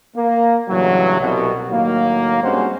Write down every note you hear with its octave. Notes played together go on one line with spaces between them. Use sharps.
A#3
A1 G2 C#3 E3 F#3
C2 B2
A2 D#3 F#3 A#3
G2 G#3 C4 C#4 F#4 C5